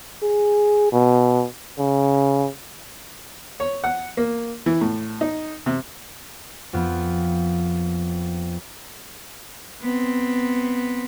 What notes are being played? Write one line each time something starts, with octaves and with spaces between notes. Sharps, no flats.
G#4
B2
C#3
C#5
F#5
A#3
E3
A2
D#4
C3
F2 B3 F4
B3 C4